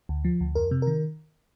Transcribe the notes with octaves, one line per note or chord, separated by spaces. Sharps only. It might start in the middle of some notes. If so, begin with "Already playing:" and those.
D2
F3
D2
F2 A#4
C3
D#3 A#4